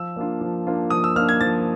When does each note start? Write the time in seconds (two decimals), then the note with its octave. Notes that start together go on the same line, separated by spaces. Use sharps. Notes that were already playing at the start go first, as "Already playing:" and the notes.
Already playing: F3 E6
0.16 A#3 D4 F4
0.41 F3
0.67 A#3 D4 F4
0.90 F3 D#6
1.04 E6
1.16 A#3 D4 F4 F6
1.29 G#6
1.41 F3 A6